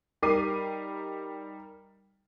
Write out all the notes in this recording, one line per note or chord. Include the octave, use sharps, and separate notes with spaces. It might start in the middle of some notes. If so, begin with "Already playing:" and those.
G3 D#4 A#4 D6 C7 D#7